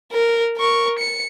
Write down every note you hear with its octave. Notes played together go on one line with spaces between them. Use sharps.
A#4
A#4 C#6
C#7